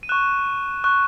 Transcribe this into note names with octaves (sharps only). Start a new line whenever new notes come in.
D#7
C#6 F#6 E7
C#6 F#6